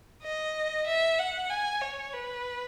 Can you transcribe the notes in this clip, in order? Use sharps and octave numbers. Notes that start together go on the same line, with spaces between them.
D#5
E5
F#5
G#5
C#5
B4